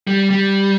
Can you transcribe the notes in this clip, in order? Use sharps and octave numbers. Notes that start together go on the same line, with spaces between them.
G3
G3